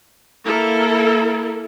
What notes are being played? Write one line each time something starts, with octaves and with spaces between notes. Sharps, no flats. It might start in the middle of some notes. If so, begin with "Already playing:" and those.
A#3 E4 A4 A#4